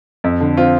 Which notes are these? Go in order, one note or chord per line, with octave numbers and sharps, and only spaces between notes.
F2
D3
C4 F4